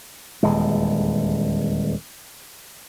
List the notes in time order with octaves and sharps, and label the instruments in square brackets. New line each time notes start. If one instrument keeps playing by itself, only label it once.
[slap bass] D#1 E2 G#3